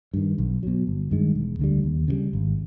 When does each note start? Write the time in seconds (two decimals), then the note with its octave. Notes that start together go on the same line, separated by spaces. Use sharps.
0.13 G2 D#3
0.38 B1
0.63 B2 F#3
0.87 G1
1.11 G2 D#3 G#3
1.35 E1
1.59 D2 D3 G3
1.84 D#2
2.08 C#3 E3 G3
2.33 G#1